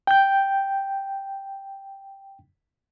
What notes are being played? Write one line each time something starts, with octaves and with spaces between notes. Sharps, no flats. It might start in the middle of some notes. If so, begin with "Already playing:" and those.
G5 G6